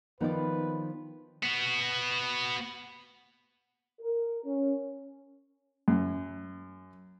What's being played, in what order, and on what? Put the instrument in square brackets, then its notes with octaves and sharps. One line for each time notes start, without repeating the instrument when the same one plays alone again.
[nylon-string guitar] D#3 F3 D#4 [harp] B3 F4 D5 [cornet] B4
[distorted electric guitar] B3 F#4
[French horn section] A#4
C#4
[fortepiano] F#2